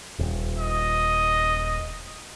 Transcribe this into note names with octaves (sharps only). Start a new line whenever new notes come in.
D#1
D#5